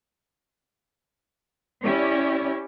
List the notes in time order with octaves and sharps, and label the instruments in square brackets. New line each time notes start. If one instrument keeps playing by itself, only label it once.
[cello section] C#4 E4 G4 C#5 D5